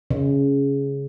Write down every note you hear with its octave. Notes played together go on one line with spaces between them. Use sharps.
C#3